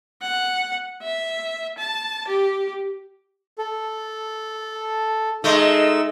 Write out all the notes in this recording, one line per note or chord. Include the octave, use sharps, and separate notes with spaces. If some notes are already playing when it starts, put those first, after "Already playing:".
F#5
E5
A5
G4
A4
G#3 A3 D#4 E6